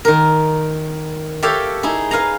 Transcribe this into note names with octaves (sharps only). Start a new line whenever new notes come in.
D#3 A#4
G4 A4 C#5 E5 F5 G5
D#4 E4 G#4
B4 F5 G#5 A#5